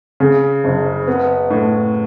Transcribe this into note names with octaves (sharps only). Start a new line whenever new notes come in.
C#3
F#1
B3
A2